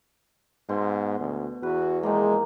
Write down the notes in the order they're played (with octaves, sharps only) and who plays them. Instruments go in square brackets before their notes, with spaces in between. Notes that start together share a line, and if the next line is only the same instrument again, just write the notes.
[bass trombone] G#2 [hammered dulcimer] B2 C6
[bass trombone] D2
[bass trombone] E2 [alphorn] F#4 [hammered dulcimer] B4
[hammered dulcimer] D#3 F3 A#3 [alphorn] G#3